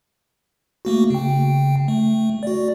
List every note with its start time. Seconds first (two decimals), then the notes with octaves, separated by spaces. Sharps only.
0.85 A3 A#3 F#4
1.10 C#3 G5
1.88 A3
2.43 F#4 D5